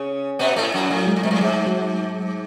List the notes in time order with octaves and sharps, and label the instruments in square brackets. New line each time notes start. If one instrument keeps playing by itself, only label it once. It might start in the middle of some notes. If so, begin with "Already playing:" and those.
Already playing: [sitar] C#3 C#4
B2 B3
A2 A3
F#2 F#3
[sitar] A2 [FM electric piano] F#3
[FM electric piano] G#3
[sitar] A2
[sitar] B2 [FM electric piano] A3
[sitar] A2
[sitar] G#2 [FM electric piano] G#3
[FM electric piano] F#3